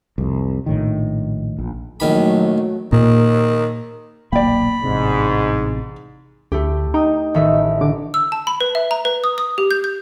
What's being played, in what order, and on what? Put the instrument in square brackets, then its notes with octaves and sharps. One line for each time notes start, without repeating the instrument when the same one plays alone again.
[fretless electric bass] C2 F2
A#1 A2 D#3
A#1
[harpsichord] A#1 D#3 B5 [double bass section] F#3 A3
[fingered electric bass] A#2 [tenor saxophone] D#3
[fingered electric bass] D#1 B1 A#3 [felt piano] D5 G5 [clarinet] B5
[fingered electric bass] A1 C3 [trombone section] G#2
[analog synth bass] D2 [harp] A3 E4 G4
[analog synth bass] D#4 [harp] G5 D#6
[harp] A1 D#3 E5
[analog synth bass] D3 [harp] D6
[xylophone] E6
A5
B5
B4
E5
A#5
B4
D#6
D#6
G4
G6
G6